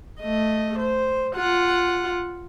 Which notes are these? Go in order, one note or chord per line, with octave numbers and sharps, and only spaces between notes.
A3 D#5
C5
F4 F#5